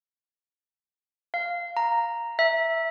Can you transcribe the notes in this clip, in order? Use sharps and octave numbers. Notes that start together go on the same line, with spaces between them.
F5
A#5
E5